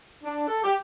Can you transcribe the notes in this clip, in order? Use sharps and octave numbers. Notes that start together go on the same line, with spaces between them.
D4
A4
G4